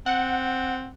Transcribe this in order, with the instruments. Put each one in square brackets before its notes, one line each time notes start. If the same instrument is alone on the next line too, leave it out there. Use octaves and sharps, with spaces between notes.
[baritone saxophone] C4 [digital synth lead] F#5